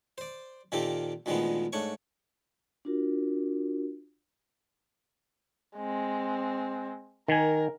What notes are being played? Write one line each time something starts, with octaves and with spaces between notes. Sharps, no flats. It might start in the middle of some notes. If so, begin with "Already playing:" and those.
C5 D5
A#2 D#3 A#3 C4 G4 A4
D2 A#2 D#3 F3 G#3 B3
G#2 A3 D4 C#5 C#6
D4 F4 F#4 A#4
G#3 C4
D#3 A#4 G#5